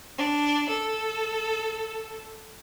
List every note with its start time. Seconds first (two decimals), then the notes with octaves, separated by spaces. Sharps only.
0.18 D4
0.68 A4